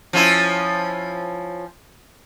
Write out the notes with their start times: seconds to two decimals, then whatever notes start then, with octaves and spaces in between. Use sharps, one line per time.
0.13 F3 C#4 E4